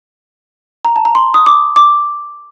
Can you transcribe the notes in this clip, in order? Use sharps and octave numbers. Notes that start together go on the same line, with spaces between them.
A#5
A5
A#5
C6
D#6
D6
D6